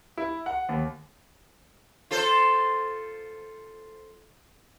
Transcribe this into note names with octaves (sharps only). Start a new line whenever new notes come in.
E4
F#5
D#2
F4 A4 C5